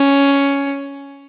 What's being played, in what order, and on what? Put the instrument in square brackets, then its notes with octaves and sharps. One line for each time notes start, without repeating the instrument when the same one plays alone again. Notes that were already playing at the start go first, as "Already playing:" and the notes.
Already playing: [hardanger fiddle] C#4